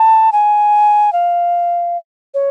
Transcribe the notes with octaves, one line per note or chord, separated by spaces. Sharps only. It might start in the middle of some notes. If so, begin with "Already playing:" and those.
Already playing: A5
G#5
F5
C#5